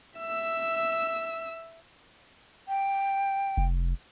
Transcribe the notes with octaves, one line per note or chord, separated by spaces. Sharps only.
E5 E6
G5
F1